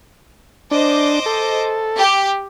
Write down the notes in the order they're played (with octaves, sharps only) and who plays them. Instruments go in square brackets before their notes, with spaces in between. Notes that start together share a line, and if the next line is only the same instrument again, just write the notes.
[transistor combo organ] D4 [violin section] C5 D#5 D6
[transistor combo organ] A4
[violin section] G4